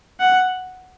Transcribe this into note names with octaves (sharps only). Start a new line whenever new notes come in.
F#5